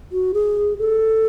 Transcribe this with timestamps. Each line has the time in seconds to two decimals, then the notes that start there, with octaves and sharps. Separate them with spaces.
0.12 F#4
0.34 G#4
0.79 A4